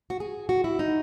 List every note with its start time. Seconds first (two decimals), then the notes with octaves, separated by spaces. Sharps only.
0.10 F#4
0.20 G#4
0.49 F#4
0.64 E4
0.79 D#4